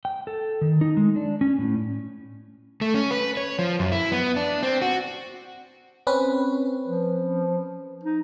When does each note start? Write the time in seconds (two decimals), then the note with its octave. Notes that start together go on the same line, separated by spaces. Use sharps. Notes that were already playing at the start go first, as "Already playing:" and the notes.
0.05 G5
0.27 A4
0.61 D#3
0.81 D#4
0.97 G#3
1.16 D4
1.41 C#4
1.58 A2
2.81 A3
2.94 C#4
3.11 B4
3.37 C#5
3.59 F3
3.79 F#2
3.92 E4
4.12 B3
4.36 D4
4.63 C4
4.82 F#4
6.07 C4 C#4 B4
6.87 F3
8.03 D#4